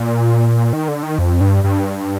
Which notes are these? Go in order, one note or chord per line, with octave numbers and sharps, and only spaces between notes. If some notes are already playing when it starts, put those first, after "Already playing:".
Already playing: A#2
D#3
D3
D#3
F2
G2
G2